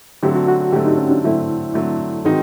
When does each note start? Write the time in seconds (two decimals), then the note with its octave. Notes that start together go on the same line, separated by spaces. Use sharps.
0.23 D3 F#3 A3 C4 G4
0.36 F#4
0.48 F#4
0.61 F#4
0.72 D3 F#3 A3 C4 G4
0.85 D#4
0.98 C#4
1.11 D4
1.24 D3 F#3 A3 C4 E4
1.74 D3 F#3 A3 C4
2.24 D#3 G#3 C4 D#4 F#4